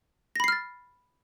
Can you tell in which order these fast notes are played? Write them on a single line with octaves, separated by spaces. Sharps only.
A#6 B5 C7 F6 A6